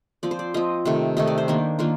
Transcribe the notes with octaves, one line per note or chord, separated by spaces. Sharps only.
F3 C4 D5
C5
D5
F3 C4 D#5
C3 D#3 A3
C3 D#3 A3 D#5
D5
C5
D#3 A#3 D4
D#3 A#3 D4 F4